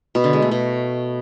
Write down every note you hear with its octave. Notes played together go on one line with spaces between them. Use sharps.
B2
D3
G#3
A3
B2